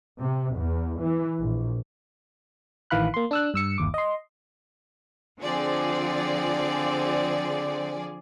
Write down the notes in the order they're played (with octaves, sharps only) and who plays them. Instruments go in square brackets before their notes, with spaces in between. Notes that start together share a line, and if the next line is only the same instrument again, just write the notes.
[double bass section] C3
E2
E3
A#1
[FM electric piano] A1 D#3 E3 F5 B5 F#6
A#3 C6
D4 E6 F#6
G2 E6 C#7
G1 D#2 D6
D#5 C6
[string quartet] D3 C4 [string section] F3 G#4 D5